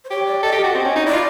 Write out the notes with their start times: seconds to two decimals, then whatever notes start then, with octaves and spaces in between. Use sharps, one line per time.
0.05 C5
0.10 G4 C#5
0.26 D5
0.43 A4 D#5
0.53 G4
0.63 F#4
0.75 C4
0.85 C#4
0.96 D#4
1.06 E4 D5
1.13 F4